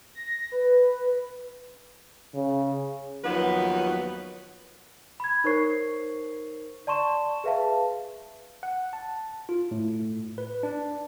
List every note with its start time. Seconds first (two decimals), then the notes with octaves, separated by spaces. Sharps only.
0.15 A#6
0.52 B4
2.35 C#3
3.24 D#2 F3 F#3 B3 D#4 B4
5.20 B5 G#6
5.44 D#4 A#4 C5 C#5 C#6 C7
6.87 D5 A5 C6 C#6 E7
7.44 G#4 B4 E5 F5 A5
8.63 F#5
8.93 A5
9.49 F4
9.71 A2
10.38 B4
10.63 D4